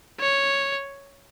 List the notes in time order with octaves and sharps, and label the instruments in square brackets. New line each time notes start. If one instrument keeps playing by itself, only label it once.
[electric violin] C#5